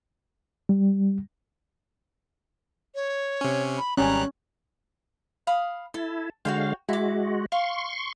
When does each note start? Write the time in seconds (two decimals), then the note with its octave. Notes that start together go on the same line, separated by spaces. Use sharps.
0.69 G3
2.95 C#5
3.41 C3 C#4
3.78 B5
3.97 G#1 G3 C#4 A#5 F#6
5.47 F5 B5 D#6
5.94 E4 A4 A5
6.45 D3 G#3 F#4 C#5 F5 G5
6.89 G#3 E4 F#4 D6
7.52 F5 C6 C#6